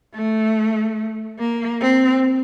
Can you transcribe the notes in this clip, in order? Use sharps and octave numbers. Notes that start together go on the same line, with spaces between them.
A3
A#3
C4